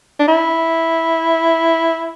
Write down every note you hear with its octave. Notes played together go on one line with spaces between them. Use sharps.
D4
E4